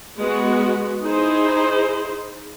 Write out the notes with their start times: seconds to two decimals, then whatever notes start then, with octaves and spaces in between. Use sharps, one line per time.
0.19 G#3 B3 F#4
1.03 D#4 E4 G#4 C5